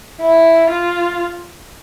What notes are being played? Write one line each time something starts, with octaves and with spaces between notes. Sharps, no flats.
E4
F4